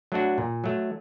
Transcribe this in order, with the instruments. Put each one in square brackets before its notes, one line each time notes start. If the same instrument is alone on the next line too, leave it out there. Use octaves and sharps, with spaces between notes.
[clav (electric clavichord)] F#3 A3 D4 F#4
A#2
F#3 A3